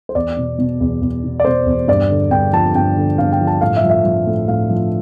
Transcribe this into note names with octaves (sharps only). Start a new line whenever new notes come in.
C5
E2 D5
B2
B2
E2
E2
B2
D5
B2 C5
E2
G2 D5
D3
G2 G5
F3 A5
G2 G5
D3
G2 F5
G5
F3
A5
A2 F5
E5
F3
E5
F3
A2
A2 F5
F3